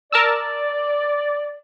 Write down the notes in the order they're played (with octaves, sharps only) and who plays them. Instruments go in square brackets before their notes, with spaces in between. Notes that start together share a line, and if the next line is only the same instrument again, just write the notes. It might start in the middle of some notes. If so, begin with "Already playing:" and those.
[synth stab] A#4 A5 E6 [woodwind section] D5